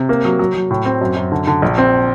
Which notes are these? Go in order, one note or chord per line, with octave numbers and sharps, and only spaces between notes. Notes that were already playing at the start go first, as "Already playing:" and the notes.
Already playing: C3
A#3
F#3
F#3
F#3
A2
C4
F#2
F#2
D3
D3
A#1
C4